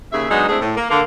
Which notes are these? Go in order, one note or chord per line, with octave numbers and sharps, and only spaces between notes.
D#2 C#3 G#4 E5
F#3 G#3 B3 D4 D#4
G#3 A3 C4 D4 E4 G#4
A2
A#3
D3 A#3